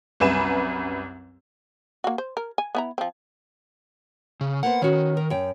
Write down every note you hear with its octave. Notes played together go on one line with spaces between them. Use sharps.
C2 F#2 B4 G#5 E7
A#3 F#4
C5
A#4
G#5
B3 E4 A#5
F3 C4
C#3
A#3 B3 C5 F#5
D#3 C#4 F#4
A#4
F#2 G5